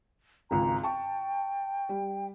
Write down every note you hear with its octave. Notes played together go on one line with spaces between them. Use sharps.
G#1 C#2 A#5
G5 A5 C#6
G3